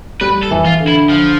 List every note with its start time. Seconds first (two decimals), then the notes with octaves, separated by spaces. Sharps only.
0.21 G3 B4
0.43 A4
0.51 E3
0.66 F4
0.80 D3
0.88 E4
1.10 F3